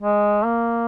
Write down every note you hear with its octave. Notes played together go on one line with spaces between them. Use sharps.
G#3
A#3